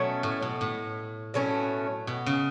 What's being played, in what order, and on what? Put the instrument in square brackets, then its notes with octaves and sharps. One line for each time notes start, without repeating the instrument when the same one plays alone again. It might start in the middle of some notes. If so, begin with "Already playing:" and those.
Already playing: [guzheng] B2 [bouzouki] F#3 A3 C#4
[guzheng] A2
B2
A2
[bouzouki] B2 F#3 A3 C#4
[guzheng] B2
C#3